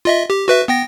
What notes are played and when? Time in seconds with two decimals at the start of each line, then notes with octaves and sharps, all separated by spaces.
0.05 F4 D#5 E5
0.30 G4
0.48 F#4 B4 E5
0.68 B3 G5 A#6